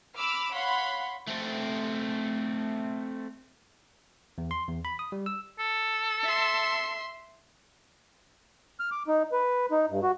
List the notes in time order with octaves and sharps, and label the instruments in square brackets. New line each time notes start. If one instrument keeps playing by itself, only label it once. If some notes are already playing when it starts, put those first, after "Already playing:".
[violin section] B5 D6 E6 F6
C#5 F5 F#5 B5 C6
[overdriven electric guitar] A3 C4
[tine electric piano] E2
C6
E2
B5
D#6
G3
E6
[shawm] A4
[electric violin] E5 C6
[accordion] F6
D6
D#4
B4
D#4
G2
F#4